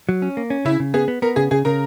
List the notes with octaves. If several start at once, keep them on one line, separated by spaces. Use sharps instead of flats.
F#3
C#4
A#3
C#4
C#3 E4
C#3
B3 G#4
B3
B3 A#4
C#3 G#4
C#3 G#4
C#3 A#4